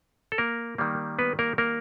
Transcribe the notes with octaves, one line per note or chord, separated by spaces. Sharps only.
A4
A#3 A#4
D#3 G3 A#3
B3 B4
A#3 A#4
A#3 A#4